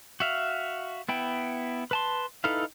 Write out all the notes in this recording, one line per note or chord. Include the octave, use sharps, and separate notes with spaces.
F#4 E5 F5
B3 E4 G5
B4 A5 C6
D#4 E4 A4 B4 F5